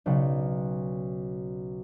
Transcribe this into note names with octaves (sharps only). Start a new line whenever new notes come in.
B1 C#3 D5 F#5